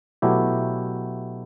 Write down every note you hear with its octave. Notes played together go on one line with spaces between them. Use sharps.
B2 F#3 A3 E4 G4